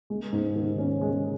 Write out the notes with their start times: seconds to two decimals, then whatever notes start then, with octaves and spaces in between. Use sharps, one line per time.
0.10 G#3
0.32 G#2
0.56 D#3
0.78 C#4
1.01 G#3